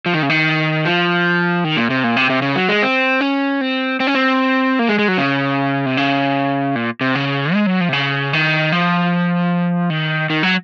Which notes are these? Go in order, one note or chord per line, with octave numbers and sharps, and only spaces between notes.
F3
D#3
C#3
D#3
F3
D#3
A#2
C3
A#2
C3
C3
C#3
F#3
G#3
C4
C#4
C4
C4
C#4
C4
A#3
G#3
G#3
F#3
C#3
C3
C#3
A#2
C3
C#3
G#3
F#3
F3
C3
C#3
D#3
F3
D#3
D#3
F#3